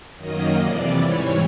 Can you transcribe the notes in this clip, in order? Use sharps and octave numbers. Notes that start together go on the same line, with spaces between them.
F#2 D#3 F#3 A#3 D#5
F2 C3 E3 D5
G#2 E3 G3 C#5